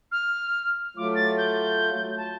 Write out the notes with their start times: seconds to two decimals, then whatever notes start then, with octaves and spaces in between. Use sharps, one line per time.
0.11 F6
0.97 F#3 A3 F4 D6
1.15 A6
1.37 G6
2.17 A5